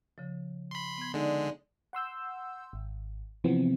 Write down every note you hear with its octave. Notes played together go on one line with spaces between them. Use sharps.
C#3 F3
B5 C6
B3 G#6
D3 G#3 D#4 D5
F#5 C6 E6 G6
G#1
C3 E3 F3 B3 C4